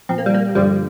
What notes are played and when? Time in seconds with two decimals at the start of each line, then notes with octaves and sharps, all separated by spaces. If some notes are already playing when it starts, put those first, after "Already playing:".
0.09 A#2 F3 C4
0.18 A#3
0.26 G3
0.34 A#3
0.55 G2 D3 F3 G3